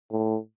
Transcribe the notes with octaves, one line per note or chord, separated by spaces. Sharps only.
A2